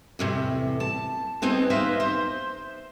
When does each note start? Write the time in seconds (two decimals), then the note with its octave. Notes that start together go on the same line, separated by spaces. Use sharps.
0.19 E2 A2 C3
0.80 A5
1.42 B3 C4 D#4 G#4
1.70 D#4 B4 C5 E5 F5
2.00 C5